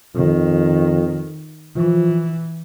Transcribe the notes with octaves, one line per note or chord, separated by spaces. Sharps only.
F2 D#3
E3 F3